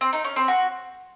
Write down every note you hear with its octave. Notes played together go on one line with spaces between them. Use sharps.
C4
D#4
C#4
C4
F#4